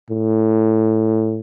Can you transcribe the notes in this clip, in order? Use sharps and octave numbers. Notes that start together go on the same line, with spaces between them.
A2